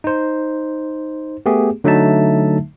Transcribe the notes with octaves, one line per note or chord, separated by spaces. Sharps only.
D#4 C5
A3 B3 G4 G#4
D3 F#3 A3 D#4 E5 A5